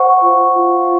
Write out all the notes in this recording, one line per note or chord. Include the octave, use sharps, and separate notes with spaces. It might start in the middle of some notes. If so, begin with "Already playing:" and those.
Already playing: C5 F#5 C#6
F4
F4